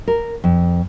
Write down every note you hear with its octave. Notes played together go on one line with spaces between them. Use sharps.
A#4
F2